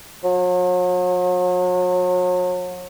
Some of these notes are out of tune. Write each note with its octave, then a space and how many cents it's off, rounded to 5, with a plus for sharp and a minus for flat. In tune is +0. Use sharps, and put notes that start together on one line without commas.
F#3 -40